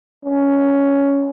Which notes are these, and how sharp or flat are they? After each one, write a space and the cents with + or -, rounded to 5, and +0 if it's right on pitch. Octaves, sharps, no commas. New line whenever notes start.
C#4 +10